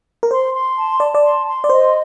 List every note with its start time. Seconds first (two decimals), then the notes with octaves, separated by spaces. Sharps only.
0.23 A#4
0.31 C5 C6
0.54 C6
0.77 A5
1.00 D5 A5
1.15 D5
1.23 C6
1.47 C6
1.64 D5
1.69 C5 D#5